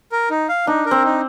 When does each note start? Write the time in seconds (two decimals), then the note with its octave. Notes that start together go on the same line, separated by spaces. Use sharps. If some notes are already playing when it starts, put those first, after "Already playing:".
0.12 A#4
0.30 D#4
0.49 F5
0.67 D4 D#4
0.86 A#4
0.91 C4
1.04 D#4